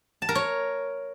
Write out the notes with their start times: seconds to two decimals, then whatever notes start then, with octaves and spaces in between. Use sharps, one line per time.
0.22 A5
0.29 A#4
0.35 C#5